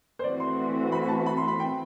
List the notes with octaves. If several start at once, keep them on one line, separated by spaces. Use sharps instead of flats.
C5
E3 A3 C4 F#4 D5
C6
B5
A5
B5
C6
B5
G5